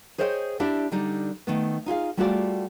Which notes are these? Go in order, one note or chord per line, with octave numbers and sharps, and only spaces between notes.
G#4 C5 C#5 D#5 E5 G5
D4 E4 G4 D5 E5
D3 G3 D#4
D#3 A3 B3
D#4 F4 G#4 F5
G3 A3 F4 F#4 G#4 D5